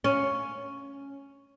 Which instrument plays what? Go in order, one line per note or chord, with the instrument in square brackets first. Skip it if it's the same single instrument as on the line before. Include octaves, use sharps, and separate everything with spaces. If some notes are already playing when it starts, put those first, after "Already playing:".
[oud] C#4